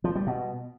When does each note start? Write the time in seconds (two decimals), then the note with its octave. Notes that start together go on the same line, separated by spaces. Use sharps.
0.04 F3
0.16 G3
0.27 B2